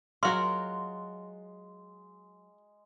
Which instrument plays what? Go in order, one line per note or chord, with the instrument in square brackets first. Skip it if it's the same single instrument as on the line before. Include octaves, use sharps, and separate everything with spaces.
[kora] F#3 F5 [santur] G#3 [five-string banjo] F4 F#4 A#4 [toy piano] C6